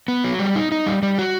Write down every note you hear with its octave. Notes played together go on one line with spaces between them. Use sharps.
B3
F#3
G3
D#4
D#4
G3
G3
F#4